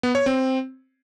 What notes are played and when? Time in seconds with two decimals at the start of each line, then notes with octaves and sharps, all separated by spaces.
0.03 B3
0.15 C#5
0.26 C4